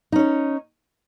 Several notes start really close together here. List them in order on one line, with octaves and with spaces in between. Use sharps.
D#4 C#4 C#5